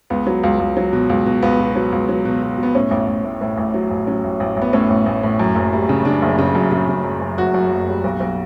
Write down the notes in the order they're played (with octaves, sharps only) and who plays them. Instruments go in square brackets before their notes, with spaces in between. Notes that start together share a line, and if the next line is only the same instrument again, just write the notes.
[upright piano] C#2 B3
F#3
C#2
C#2
F#3
B2
C#2
B2
C#2 B3
B2
F#3
C#2
F#3
B2
B2
B2 B3
A2 C#4
A1
A1
A2
A2
A1
F#3
A1
F#3 C#4
A1
A1
A1 B3
A2 C#4
A1
A1
A2
F#2
F#1
G3
C#3
C#3 D4
F#1
C#3
F#2
C#3
C#3
F#2
F#2
F#1 F#4
F#2
F#1
G3
B1
B1